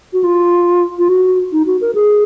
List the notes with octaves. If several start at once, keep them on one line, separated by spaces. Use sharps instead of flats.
F#4
F4
F4
F#4
D#4
F#4
A#4
G#4